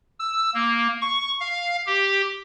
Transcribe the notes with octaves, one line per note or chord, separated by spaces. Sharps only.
E6
A#3
C#6
F5
G4